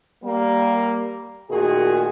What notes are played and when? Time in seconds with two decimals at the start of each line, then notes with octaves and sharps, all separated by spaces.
0.24 G3 A#3
1.50 A#2 D#3 A3 F#4 G#4